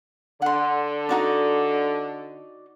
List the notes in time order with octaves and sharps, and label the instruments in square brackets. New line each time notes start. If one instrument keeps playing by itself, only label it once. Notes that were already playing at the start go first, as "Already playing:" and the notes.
[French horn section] D3 [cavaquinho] F#5 C6
[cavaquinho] D#4 F#4 D5